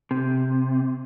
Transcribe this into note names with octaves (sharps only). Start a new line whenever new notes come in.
C3